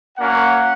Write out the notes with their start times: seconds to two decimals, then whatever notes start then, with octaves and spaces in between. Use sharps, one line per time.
0.17 A#3 C#4 F#4 F#5